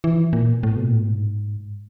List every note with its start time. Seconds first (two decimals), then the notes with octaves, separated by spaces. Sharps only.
0.04 E3
0.33 A#2
0.63 A2
0.76 B2
0.85 A#2
0.93 A2
1.02 G#2